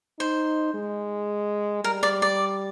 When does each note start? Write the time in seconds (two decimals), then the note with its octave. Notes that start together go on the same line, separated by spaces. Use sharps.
0.19 D#4 C5
0.74 G#3
1.84 G3 A#4
2.03 D5
2.22 D5